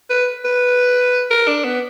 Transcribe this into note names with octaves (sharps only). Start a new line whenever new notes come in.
B4
B4
A#4
D4
B3